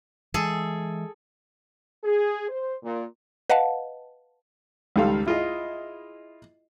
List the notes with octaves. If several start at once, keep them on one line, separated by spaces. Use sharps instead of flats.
E3 G#3 G#4 A4
G#4
C5
A#2
B4 D#5 F5 F#5 A5
C#2 D#3 G3 A4 F5 C6
E4 F4 G#4 D#5